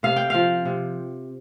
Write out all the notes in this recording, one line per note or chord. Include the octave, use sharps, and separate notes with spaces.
C3 F5
G5
F3 F5
C3